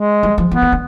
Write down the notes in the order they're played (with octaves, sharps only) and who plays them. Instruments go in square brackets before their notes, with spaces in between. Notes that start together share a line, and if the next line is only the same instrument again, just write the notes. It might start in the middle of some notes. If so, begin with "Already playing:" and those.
Already playing: [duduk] G#3
[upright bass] G3
F3
[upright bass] E3 [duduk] B3
[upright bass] D#3
D3